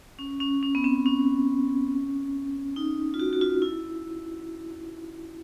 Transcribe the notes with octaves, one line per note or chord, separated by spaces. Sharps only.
C#4
C#4
C#4
B3
C4
C#4
D#4
F4
F#4
F#4
F4
E4